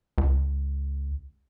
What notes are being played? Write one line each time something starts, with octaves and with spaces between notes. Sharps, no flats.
C#2